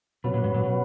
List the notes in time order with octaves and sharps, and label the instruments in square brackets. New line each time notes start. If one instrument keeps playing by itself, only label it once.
[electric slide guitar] B2 [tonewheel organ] F#3 C#4 F#4 B4
[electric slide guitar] A#2
G#2
A#2
B2